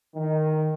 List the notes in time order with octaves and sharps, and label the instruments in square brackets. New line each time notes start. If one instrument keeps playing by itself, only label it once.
[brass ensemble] D#3